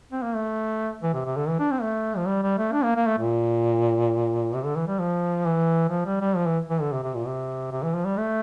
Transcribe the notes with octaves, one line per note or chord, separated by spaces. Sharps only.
C4
A#3
A3
E3
C3
C3
D3
E3
D4
C4
A3
F3
G3
G3
A3
D4
A#3
A#3
A3
A#2
C3
D3
E3
G3
F3
E3
F3
G3
G3
F3
E3
E3
D3
C3
C3
A#2
C3
C3
E3
F3
G3
A3